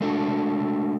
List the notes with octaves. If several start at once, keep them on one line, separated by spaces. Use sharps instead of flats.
G#3 A3 D4 F#4